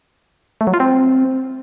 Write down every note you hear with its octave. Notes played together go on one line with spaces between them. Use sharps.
A3
F#3
F4
C4